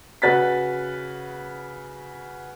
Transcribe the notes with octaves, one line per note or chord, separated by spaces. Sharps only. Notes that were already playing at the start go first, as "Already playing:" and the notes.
C#3 F#4 B4 A6 B6